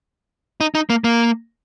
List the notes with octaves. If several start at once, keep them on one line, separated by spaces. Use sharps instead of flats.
D#4
D#4
A#3
A#3